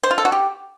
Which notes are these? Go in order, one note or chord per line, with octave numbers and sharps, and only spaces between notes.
C5
F4
A4
F#4
G4